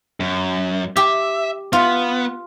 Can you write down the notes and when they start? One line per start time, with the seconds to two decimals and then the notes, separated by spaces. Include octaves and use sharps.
0.20 F#2
0.97 G4 E5
1.73 B3 F4